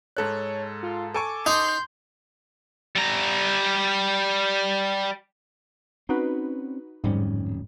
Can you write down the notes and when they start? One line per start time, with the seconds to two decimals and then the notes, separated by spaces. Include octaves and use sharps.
0.17 G#2 A4 C#5 F#6
0.83 F4
1.14 A4 G#5 C#6 D6
1.46 D#4 C6 G6
2.96 G3 A#5
6.09 C4 C#4 D#4 F#4 B4
7.04 D1 F2 G#2 G3 C#4